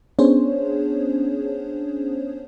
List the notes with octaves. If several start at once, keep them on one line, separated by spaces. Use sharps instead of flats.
B3 C#4 D4 G#4 C5 C#5